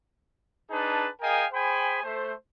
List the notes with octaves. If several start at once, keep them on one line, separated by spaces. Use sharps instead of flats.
D4 D#4 G#4 B4 A5
G#4 A#4 D#5 F5 G5 G#5
G#4 C5 G5 G#5 B5
A3 C5